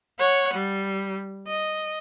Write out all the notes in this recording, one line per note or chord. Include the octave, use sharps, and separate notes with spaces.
C#5 F#5
G3
D#5